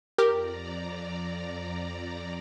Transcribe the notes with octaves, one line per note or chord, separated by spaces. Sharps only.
F2 G4 A#4 D5 A#5